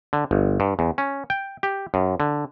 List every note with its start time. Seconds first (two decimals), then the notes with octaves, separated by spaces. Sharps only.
0.13 D3
0.31 G1
0.60 G2
0.79 E2
0.98 C#4
1.30 G5
1.63 G4
1.94 F#2
2.20 D3